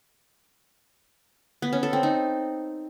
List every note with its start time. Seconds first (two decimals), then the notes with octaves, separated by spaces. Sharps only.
1.62 B3
1.73 C#4
1.83 A4
1.93 C4
2.03 D#4